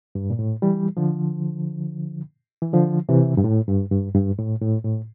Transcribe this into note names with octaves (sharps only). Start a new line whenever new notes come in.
G2
A#2
A2
E3 G3
D3 F3
E3
D3 F3
C3 E3
G2
A2
G2
G2
G2
A2
A2
A2